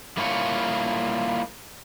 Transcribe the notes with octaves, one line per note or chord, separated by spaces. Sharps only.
G3 A#3 E4 F4 C#5